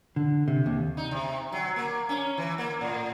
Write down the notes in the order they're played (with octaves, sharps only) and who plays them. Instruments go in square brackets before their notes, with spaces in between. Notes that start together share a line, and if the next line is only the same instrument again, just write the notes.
[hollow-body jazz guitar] D3
C3
D#2
[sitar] D#4
C3
F#3
A#3
C#4
E3
A#3
A2